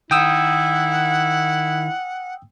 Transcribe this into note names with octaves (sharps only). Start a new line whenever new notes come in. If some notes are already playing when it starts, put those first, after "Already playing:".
D#3 E4 F#5 G5 D#6 E6